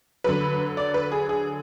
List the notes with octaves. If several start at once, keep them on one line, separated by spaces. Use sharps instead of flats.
D3 F#3 B4
D5
B4
G#4
G#4